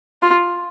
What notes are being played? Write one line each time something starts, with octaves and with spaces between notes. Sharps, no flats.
F4